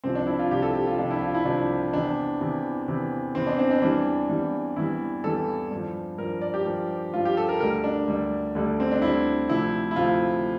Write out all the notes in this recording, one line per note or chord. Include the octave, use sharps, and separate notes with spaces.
C2 C3 F3 C4
D4
E4
F4
C2 C3 F3 G4
A4
G4
F4
C2 C3 F3 D4
E4
F4
E4
C2 C3 F3 D4
E2 C3 E3 D4
E2 C3 E3
E2 C3 E3
E2 C3 E3 C4
D4
C4
D4
E2 E3 G3 D4
E2 E3 G3
E2 E3 G3 E4
E2 E3 G3 A4
G2 F3
G2 F3 A#4
D5
G4
G2 F3
G2 F3 F4
G4
A4
A#4
D2 D3 G3 A#4
D4
D2 D3 G3
D2 D3 G3
C4
D4
D2 D3 G3 E4
D2 C3 F3 E4
E4
D2 C3 F3 F4